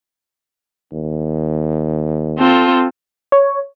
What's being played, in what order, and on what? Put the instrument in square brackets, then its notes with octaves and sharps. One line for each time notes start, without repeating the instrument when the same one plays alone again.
[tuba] D#2
[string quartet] C4 F4 A4
[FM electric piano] C#5